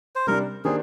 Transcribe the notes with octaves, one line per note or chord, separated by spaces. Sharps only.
C5
C3 G3 D4 A#4
D#3 A#3 D4 G4 G#4 C5